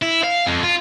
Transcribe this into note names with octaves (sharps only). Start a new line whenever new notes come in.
E4
F5
F2
F4